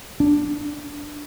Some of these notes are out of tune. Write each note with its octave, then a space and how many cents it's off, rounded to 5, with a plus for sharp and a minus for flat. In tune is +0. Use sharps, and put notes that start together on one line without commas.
D4 +5